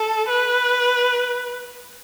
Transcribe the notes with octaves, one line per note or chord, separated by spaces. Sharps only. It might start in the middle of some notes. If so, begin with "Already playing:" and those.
Already playing: A4
B4